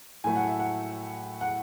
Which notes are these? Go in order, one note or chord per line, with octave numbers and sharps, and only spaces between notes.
A2 F#3 A3 G#5
F#5
E5
F#5
F#5